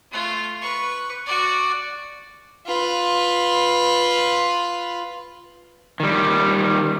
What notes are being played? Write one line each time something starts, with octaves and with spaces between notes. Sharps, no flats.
A3 F4
B4 C#6
F#4 D5
F4 B4
D#3 G3